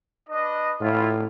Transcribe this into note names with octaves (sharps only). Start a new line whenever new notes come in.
D4 B4 D#5
A2 E4 F4